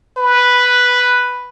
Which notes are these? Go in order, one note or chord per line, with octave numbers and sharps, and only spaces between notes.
B4